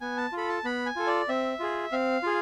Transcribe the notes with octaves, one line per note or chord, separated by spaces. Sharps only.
B3 G#5
A5
F4 A4 B5
A5
B3 B5
G#5
F4 A4
D5
C4 E5
F4 G#4
C4 F5
F4 G#4